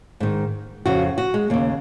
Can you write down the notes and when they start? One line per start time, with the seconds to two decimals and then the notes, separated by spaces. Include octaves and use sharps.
0.20 G#2 D#3
0.85 F2 C#3 F#4
1.18 F#4
1.34 G#3
1.50 D#2 C#3 A#3